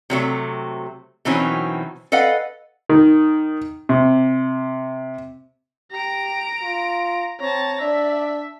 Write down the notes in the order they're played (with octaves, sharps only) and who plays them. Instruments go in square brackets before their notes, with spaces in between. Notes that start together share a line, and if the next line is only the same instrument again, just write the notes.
[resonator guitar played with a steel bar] C3 F#3 A3
B2 D#3 E3 F#3 C4 C#4
A4 B4 D#5 F5 F#5
[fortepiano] D#3
C3
[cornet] G4 [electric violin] A#5 D7
[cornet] F4
[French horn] C4 [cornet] C#5 [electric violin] A5 A#5
[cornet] D4 [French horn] D5 [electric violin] E5